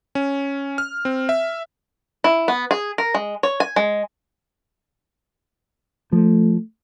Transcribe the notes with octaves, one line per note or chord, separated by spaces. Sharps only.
C#4
F6
C4
E5
E4
B3
G#4
A#4
G#3
C#5
G#5
G#3
F3 A3